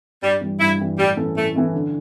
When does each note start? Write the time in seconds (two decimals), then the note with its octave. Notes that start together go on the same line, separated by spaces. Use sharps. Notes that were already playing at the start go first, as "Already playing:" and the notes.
0.22 G2 G3
0.41 E3 G3
0.60 G2 E4
0.79 E3 G3
0.98 A2 G3
1.17 E3 A3 C#4 E4
1.35 A2 A3
1.56 E3 A3 C#4 E4
1.74 D3